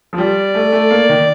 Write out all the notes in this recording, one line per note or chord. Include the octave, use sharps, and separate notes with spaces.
F3
G3 D5
A3
A3
A#3
D#3